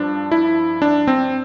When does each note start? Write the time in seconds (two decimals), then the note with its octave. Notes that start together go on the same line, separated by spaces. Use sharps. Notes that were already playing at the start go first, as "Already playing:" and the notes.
Already playing: G2 F3 D4
0.32 E4
0.82 D4
1.07 C4